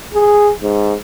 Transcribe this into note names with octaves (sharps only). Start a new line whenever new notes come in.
G#4
G#2